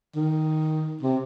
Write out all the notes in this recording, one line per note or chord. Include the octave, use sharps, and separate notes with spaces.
D#3
C3